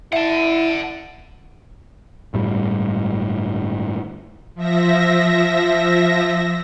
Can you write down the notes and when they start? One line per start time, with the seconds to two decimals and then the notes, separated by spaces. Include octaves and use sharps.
0.13 E4 E5 F#5 A5
2.34 G1 A2 G3
4.55 F3 E5 A#6